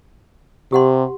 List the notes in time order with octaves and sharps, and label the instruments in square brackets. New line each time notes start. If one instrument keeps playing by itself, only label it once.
[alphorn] C3 [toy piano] G4 F#5 C6